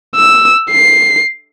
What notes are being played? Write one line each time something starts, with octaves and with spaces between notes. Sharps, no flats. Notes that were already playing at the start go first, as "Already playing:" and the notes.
E6
C7